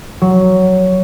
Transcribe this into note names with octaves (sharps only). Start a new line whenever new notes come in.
F#3